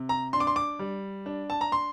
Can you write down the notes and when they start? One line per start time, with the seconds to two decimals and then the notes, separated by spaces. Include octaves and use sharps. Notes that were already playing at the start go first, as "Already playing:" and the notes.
Already playing: C3
0.09 A#5
0.33 D4 C6
0.40 D6
0.47 C6
0.56 D6
0.79 G3
1.26 D4
1.50 A5
1.61 A#5
1.72 C6